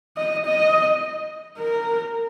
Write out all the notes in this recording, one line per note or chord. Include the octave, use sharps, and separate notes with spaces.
D#5
D#5
A#4